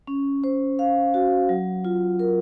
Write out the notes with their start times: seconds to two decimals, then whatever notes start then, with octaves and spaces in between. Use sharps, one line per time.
0.07 C#4
0.44 C5
0.79 F5
1.14 F#4
1.49 F#3
1.85 F4
2.19 A#4